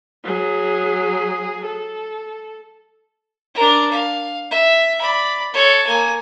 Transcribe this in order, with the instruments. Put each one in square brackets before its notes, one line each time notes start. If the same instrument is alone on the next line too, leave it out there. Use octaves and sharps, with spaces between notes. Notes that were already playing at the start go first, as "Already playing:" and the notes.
[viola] F#3 G#4
A4
[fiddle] D4 A#4
F5
E5
D5 B5
A4 C#5
A#3 G#5